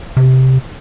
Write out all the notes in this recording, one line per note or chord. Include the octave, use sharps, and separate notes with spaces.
C3